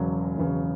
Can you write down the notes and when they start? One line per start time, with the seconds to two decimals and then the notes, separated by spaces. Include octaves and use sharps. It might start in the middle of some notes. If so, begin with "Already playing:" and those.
Already playing: E1 E2 C#3 F#3
0.37 E1 E2 C#3 F#3